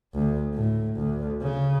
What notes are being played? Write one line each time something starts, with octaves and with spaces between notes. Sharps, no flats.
D2
A2
D2
C#3